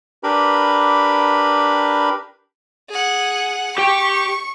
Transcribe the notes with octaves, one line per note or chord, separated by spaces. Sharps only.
D4 G4 A#4 B4 B5
G#4 F#5
G4 G5 C#6